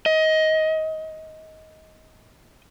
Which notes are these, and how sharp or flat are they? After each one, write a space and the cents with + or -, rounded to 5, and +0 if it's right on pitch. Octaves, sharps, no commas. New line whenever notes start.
D#5 +20